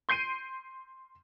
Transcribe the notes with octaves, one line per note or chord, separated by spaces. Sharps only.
C6 G6 C7 D7 D#7